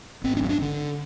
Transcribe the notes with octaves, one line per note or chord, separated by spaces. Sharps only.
G#1 C4
D4
G2
D4
D3